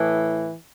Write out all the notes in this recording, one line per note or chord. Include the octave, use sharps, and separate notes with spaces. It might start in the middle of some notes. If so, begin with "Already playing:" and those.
Already playing: A2 E3